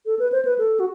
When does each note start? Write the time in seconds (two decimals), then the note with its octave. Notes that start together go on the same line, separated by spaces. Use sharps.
0.06 A4
0.19 B4
0.32 C5
0.45 B4
0.58 A4
0.80 F#4